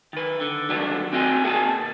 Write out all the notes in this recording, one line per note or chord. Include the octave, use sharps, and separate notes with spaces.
D#3 B4
D3
D#3 F#3 G3 B3 D4 A4
C4 F#4 D#5 E5 G5 G#5
D#2 G#4 F#5 G#5 A5
B2